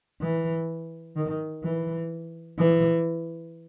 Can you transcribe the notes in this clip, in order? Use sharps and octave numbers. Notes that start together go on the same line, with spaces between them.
E3
D#3
E3
E3